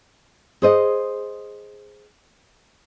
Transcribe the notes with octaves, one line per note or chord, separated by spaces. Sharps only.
G#4 C5 D#5